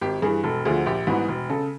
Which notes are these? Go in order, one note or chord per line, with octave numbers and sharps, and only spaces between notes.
G#1 G4
G2 E3 G#4
E1 A4
D2 D3 F3 G#4
A#1 G4
G#2 E3 G3 B3 F#4
E1
C#3 A4